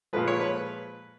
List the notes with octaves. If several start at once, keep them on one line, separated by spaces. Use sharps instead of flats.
A#2 F3 G#3 B4
C#5
B4